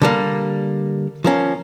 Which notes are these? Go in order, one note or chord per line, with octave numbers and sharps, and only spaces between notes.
D3 G3 A#3
F3 A#3 C#4